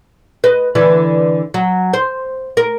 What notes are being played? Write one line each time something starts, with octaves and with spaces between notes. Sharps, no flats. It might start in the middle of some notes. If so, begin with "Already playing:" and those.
B4 D#5
D3 E3 B4
F#3
C5
A#4